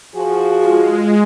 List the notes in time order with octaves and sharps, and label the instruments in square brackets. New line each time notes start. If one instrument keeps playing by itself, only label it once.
[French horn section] F3 F#4 [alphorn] G#4 [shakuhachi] G#5
[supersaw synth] G#3 [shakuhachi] F4